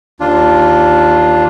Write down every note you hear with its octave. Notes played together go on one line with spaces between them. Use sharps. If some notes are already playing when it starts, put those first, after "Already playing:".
D#2 D4 F4